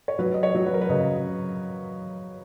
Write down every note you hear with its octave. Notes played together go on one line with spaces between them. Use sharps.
C#5
F#3 B4
D#5
C#5
F#3
B4
A#4
B4
C#3 D#5